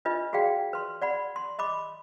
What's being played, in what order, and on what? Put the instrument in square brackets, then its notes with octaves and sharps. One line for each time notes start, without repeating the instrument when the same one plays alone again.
[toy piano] D4 F4 B4 D#5
F#4 G#4 D5 F5 G5
B4 C6
D5 F#5 B5
C6
D#5 B5 D6